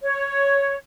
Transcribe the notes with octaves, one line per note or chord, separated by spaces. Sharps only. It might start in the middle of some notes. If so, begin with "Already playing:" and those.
C#5